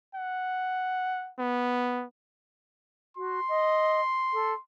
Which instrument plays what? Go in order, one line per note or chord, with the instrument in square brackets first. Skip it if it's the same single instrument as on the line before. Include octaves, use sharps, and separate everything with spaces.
[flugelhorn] F#5
B3
[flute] F#4 [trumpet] C6
[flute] D#5
A4